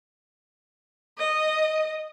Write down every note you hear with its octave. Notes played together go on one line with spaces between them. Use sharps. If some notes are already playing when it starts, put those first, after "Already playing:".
D#5